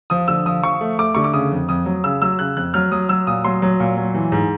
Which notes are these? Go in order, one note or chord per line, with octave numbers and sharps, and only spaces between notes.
F3 D#6
D3 E6
F3 D#6
F3 C#6
A3
A3 D6
D3 C#6
D6
C#3 D#6
F2
F2 D#6
F#3
C#3 E6
F#3 E6
C#3 F#6
F2 F#6
F#3 F6
F#3 D#6
F#3 E6
A#2 D#6
F#3 C6
F#3
A#2
F#3
E3
G#2